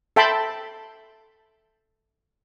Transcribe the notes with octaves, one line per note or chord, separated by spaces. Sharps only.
A4 E5 G5 A5 B5 C6